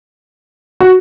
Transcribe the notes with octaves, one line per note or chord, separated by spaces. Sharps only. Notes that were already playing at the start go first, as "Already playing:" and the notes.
F#4